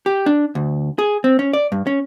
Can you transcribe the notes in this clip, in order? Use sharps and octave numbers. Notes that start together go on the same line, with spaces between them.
G4
D4
D2
G#4
C4
C#4
D5
G2
C#4